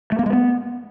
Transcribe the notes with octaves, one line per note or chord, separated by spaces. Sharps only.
A3
A#3
G#3
B3